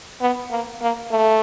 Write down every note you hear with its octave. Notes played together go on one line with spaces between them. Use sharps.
B3
A#3
A#3
A3